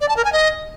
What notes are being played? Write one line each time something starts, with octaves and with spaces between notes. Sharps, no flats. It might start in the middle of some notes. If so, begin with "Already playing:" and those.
D5
A5
A#4
G#5
D#5